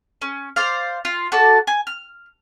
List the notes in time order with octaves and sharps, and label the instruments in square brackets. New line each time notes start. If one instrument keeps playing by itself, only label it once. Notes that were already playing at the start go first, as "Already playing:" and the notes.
[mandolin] C#4
C5 D5 F5
F4
F#4 A4 D5 A5
G#5
F6